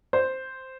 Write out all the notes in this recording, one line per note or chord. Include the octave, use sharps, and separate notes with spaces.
C5